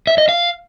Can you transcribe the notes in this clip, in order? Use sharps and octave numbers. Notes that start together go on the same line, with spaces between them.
E5
D#5
F5